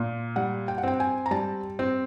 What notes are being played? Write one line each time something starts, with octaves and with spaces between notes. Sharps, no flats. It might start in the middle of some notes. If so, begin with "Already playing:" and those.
Already playing: A#2
G3 F#5
G5
F#5
C4 G5
G#5
A#5
G3 A5
C4